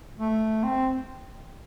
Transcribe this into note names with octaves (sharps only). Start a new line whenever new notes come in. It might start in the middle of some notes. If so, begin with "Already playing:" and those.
A3
C4